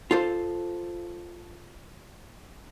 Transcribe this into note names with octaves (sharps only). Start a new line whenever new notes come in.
F4 A4 C5